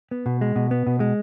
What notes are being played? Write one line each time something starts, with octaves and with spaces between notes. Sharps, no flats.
B3
B2
G#3
B2
B3
B2
G#3